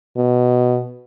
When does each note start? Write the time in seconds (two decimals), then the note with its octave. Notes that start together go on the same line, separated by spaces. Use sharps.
0.17 B2